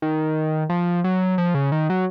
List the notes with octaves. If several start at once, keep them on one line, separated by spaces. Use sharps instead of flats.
D#3
F3
F#3
F3
C#3
D#3
F#3